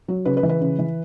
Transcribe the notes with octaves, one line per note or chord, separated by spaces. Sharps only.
F#3
C#3 B4
B4
E3
B4
C#3
E3